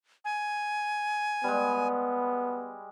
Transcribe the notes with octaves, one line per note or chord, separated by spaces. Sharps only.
G#5
G3 G#3 B3